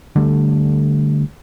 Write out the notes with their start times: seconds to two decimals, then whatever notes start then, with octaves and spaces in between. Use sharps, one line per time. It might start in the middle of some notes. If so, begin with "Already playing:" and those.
0.16 D3 G3 A3